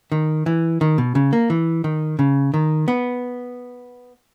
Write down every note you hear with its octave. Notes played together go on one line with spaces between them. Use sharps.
D#3
E3
D#3
B2
C#3
A#3
E3
D#3
C#3
D#3
B3